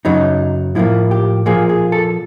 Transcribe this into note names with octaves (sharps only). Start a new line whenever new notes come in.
F#2 C#3 F#3 D#4
A2 F3 A#3 E4
G4
A#2 F3 A#3 G#4
G#4
A4